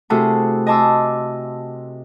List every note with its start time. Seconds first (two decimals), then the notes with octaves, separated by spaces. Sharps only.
0.10 C3 A3 E4 F#4 G#4 A4
0.67 D#5 G#5 A5 C6 D6 E6